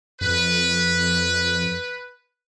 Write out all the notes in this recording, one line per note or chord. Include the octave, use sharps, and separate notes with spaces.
F2 B4